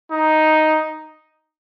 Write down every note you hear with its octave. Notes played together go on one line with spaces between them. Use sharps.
D#4